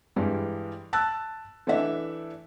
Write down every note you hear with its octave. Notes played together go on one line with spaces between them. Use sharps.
G2 E3 G3 G#3
A5 E6 F#6 A6
E3 A3 D4 E5